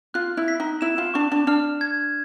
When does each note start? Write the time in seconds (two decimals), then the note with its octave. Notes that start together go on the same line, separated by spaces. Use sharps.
0.14 F4 F#6
0.37 E4
0.48 B6
0.60 D#4
0.81 E4 E7
0.98 F4
1.14 D4 C#6
1.32 D4
1.47 D4 F6
1.81 G#6